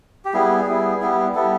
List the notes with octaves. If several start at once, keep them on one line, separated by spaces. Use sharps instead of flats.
G4
G3 B3 E4 G#4
G3 B3 E4
G3 B3 E4
G3 B3 E4 A4